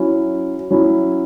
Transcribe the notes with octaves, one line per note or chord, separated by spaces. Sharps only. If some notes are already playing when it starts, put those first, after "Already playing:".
Already playing: F#3 C#4 E4
F#3 C#4 E4